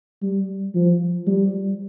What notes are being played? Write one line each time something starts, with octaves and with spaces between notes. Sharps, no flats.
G3
F3
G3